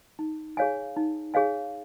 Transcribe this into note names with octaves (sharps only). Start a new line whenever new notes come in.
D#4
G#4 C#5 F5 G#5
D#4
G#4 C#5 F5 G#5